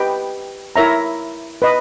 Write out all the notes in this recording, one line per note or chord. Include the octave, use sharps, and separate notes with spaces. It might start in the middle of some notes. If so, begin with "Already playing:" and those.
Already playing: G4 B4 D#5 G5
E4 A#4 C#5 E5 A#5
B4 D#5